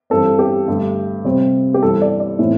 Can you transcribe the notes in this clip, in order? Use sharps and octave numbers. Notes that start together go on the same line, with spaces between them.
G2 E3 C4 A4
G4
G2 D3 A3
C3 G3 C4
G4
G2 E3 G3 C4 A4
D5
D5
A2 E3 A3 C4